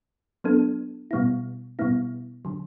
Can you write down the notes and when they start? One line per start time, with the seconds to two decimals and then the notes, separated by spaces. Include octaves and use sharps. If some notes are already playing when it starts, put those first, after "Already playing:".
0.44 F#3 B3 D4 A4
1.11 B2 G3 B3 E4
1.79 B2 G3 B3 E4
2.45 D3 F#3